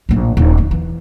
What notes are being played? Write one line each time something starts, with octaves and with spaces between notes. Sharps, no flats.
A#1 A2
D#1
F2 D#3
E3